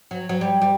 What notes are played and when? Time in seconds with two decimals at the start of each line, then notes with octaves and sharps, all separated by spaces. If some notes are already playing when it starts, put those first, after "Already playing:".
0.11 F#3
0.29 F#3
0.41 G3
0.62 G3